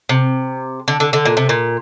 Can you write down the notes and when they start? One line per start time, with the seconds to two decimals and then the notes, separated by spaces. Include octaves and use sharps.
0.09 C3
0.88 D3
1.00 D3
1.13 D3
1.25 A#2
1.37 C3
1.49 A#2